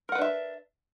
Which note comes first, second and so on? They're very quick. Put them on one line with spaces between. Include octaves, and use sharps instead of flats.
A#4 F#5 B4 D4 E5